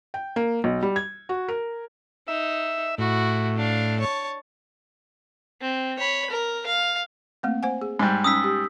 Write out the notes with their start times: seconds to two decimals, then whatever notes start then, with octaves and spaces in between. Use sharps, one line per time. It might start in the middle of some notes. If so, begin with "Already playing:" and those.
0.14 G5
0.36 A#3
0.64 B1
0.83 G3
0.96 G#6
1.29 F#4
1.48 A#4
2.28 D#4 E5
2.98 A2 E4 F#4
3.56 D4 F5
4.00 C#5 A5
5.61 C4
5.99 C#5 B5
6.30 A#4
6.66 F5
7.43 A3 A#3 C4
7.63 C5 F#5 G#5
7.81 G#4
7.99 G#2 G3
8.24 C#4 D#4 D#6 E6 B6
8.44 G4